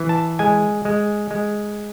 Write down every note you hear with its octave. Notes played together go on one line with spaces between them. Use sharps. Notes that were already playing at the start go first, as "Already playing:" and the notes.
Already playing: E3
A5
G#3 G#5
G#3
G#3